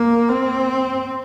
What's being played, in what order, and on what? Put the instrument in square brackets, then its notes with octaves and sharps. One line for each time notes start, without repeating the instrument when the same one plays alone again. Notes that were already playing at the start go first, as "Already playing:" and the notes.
Already playing: [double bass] A#3
C4